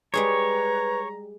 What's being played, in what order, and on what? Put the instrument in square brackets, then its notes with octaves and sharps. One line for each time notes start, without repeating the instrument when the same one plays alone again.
[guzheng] G3 G#3 G#4 [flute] B4 [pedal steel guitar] C#5 [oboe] A#5